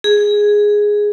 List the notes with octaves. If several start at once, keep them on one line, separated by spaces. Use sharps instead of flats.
G#4